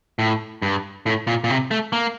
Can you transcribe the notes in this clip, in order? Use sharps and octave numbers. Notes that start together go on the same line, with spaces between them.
A2
G2
A2
A#2
A#2
C3
A3
A#3